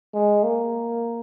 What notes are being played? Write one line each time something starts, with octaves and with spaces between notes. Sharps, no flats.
G#3
A#3